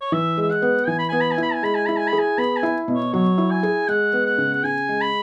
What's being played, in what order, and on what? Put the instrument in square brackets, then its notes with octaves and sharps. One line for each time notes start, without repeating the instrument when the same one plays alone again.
[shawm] C#5
[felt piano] E3 [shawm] E5
[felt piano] G#3 [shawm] E5
[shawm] F#5
[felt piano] B3
[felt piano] E3 [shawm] G#5
[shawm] B5
[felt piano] B3 [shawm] G#5
[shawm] B5
G#5
[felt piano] E4 [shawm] B5
[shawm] G#5
[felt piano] G#3 [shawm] B5
[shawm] G#5
[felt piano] E4 [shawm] B5
[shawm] G#5
B5
[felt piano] G#4
[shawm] G#5
[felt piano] B3 [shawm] B5
[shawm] G#5
[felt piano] E4
B2
[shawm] C#5
[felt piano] F#3 [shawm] C#5
[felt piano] E4
[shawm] G#5
[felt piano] G#4
[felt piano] G#3 [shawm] F#5
[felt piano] B3
[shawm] F#5
[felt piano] C#3
[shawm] F#5
[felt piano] C#3 [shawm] G#5
[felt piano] G#3
[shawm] B5